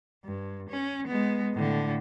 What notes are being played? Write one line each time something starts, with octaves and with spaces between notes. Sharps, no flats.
G2
C#4
G#3 B3
A2 D3